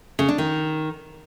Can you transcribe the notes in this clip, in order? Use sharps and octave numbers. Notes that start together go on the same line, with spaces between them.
C#3
D4
D#3